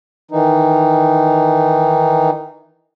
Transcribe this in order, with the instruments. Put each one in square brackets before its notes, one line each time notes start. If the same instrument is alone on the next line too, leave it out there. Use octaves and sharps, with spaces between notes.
[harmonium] D#3 E3 D#4